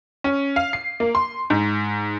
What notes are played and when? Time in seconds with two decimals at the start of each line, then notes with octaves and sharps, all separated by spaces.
0.24 C#4
0.56 F5
0.73 C7
1.00 A#3
1.15 C6
1.50 G#2